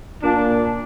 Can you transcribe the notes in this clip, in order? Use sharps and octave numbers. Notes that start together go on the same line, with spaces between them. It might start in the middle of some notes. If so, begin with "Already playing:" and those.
A#2 D4